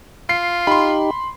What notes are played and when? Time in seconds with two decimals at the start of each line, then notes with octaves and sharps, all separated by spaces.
0.29 F4 C7
0.67 D#4 G4 B5 C6